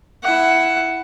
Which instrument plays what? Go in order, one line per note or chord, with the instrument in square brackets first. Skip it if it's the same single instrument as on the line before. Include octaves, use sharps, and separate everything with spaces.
[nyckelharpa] E4 F#5